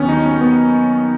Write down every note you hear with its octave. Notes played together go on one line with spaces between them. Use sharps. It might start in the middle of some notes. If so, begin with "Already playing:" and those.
Already playing: D#2 D#3 F#3 B3 C#4
D#4
C#4
B3